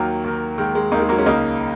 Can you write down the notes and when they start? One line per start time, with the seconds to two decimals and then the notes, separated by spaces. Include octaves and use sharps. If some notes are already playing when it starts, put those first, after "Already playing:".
Already playing: D#2 D#3 F#3 A#3
0.24 D#2 D#3
0.58 D#2 D#3 G#3
0.75 G#3
0.92 D#2 D#3 A#3 D#4
1.00 G#3
1.09 F#3 A#3
1.19 G#3 C#4
1.26 C#2 C#3 A#3 D#4